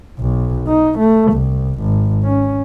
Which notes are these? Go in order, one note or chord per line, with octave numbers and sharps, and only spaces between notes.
B1
D#4
A3
C2
G#1
C#4